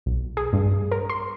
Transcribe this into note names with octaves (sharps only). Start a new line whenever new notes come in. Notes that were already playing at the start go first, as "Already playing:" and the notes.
B1
G#4
G2
A#4
C6